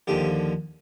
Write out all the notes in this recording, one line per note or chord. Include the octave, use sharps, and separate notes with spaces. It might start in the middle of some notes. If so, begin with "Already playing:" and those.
D#2 D3 F3 G4